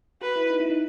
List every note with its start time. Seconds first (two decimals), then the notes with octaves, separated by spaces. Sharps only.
0.21 F#4 B4
0.36 E4
0.50 D#4
0.60 E4
0.70 D#4